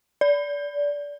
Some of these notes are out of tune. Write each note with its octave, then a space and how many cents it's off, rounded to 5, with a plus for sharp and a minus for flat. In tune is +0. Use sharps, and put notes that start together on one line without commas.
D5 -20